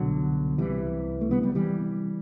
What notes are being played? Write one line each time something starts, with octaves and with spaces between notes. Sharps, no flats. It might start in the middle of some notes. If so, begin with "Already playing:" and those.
Already playing: C2 B2 D3 F#3
C2 C3 E3 G3
A3
D2 C3 G3 B3
G3 B3
E3 G3